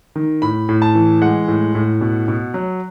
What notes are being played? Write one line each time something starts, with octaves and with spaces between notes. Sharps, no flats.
D#3
A2 B5
A2
A5
E3
G#3 F#5
A2
A2
B2
B2
F#3